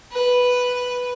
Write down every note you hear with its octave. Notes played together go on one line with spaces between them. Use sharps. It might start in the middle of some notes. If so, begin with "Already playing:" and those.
B4